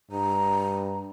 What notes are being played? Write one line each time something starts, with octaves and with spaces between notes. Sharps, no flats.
G2 A#5